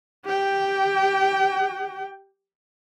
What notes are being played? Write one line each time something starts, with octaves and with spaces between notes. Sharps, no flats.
G4 G5